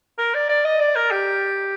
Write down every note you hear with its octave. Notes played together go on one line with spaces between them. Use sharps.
A#4
D5
D5
D#5
D5
A#4
G4